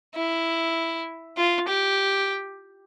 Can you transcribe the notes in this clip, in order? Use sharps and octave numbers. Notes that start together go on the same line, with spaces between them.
E4
F4
G4